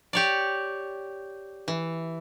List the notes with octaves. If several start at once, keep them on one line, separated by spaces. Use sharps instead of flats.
G4 C#5 D5
E3